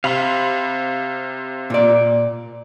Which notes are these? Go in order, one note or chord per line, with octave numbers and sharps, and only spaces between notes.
C3 F5 B5 C6
A#2 D5